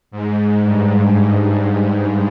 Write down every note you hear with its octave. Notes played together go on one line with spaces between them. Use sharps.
G#2
G2